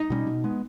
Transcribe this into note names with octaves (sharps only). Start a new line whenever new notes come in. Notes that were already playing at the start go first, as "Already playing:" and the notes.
Already playing: D#4
B2 G3 C#4
B2
G#3 B3